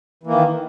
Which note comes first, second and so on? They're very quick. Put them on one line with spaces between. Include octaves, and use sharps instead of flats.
E3 A#3 D#3